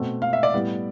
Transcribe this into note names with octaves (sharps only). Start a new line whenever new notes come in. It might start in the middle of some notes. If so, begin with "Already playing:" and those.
Already playing: B2 A3 C4
F5
E5
D5
A2 G3 B3